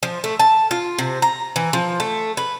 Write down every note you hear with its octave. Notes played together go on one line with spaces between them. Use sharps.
F3
A3
A5
F4
C3
A#5
E3
F3
A3
B4